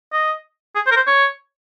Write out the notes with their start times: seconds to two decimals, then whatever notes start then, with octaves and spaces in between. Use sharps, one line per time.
0.13 D#5
0.75 G#4
0.86 C5
0.91 A#4
0.96 C5
1.07 C#5